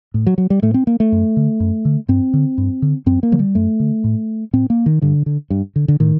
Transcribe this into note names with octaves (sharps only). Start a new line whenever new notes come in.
A2
F#3
F#3
G3
A2 A3
C4
A#3
A3
F#2
D3
F#2
D3
G2 C4
D3
G2
D3
F#2 C4
A#3
D3 F#3
G3
F#2 A3
D3
A2
A2 C4
A#3
D#3
G2 D3
D3
G2
D3
D3
A2 D#3